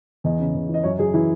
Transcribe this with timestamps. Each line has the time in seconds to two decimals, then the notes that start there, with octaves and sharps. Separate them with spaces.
0.24 E2 D#5
0.40 C#3
0.54 E2
0.69 E3
0.74 D#5
0.83 F#2 C#5
0.99 F#2 G#4
1.14 E3 E4